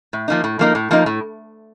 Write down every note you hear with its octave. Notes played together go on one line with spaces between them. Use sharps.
A2
F3 A#3 D#4
A2
F3 A#3 D#4
A2
F3 A#3 D#4
A2